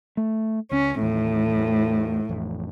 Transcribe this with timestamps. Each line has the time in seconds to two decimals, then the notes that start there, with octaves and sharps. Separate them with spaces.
0.17 A3
0.71 C#2 C#4
1.01 A1 D#2 A2
1.56 E2 A3
2.29 A1 F2